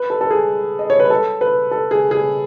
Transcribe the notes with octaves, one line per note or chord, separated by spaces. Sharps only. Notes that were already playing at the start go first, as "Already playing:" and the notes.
Already playing: B4
A4
A4
G#4
D#5
C#5
B4
A4
B4
A4
G#4
G#4